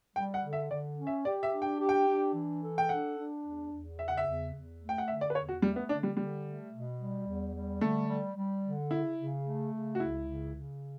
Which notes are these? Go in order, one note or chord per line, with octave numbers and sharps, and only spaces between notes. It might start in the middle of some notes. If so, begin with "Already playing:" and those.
G3 G5
F#5
D3
E5
D3 D5
C#4
E5
G4 D5
E5
D4
G5
G4
G5
D4
E3
A4
G5
D4 F#5
D4
E2
E2
C#3 E5
F#5
E5
E2
E2
A3
G5
F#5
D3 E5
D5
B4
E2 C#5
F#4
G3 A3
B3
D3 D4
G3
D3 G3
A3
B2
G3
E2
G3
D3 A3
G3
G3
D3
C#3 E4
C#3
A3
C#3
F#4
C#2 E4
C#3
C#3